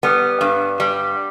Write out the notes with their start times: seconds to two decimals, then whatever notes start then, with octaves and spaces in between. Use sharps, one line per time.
0.03 G3 B3
0.41 G2
0.80 G3